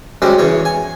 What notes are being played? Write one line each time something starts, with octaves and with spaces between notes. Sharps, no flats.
F#2 G3 G#3 C4 C#4
E2 C#3 C#5
G#5